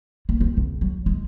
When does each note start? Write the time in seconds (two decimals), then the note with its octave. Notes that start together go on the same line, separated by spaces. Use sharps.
0.29 A#3
0.41 C4
0.57 C#3
0.81 F#3
1.06 G#3